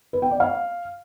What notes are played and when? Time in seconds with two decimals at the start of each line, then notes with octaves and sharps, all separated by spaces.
0.13 B4
0.22 G5
0.31 D5
0.40 F5